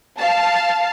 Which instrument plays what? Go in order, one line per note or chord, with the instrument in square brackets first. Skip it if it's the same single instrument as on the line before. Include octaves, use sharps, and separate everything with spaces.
[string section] F5 A5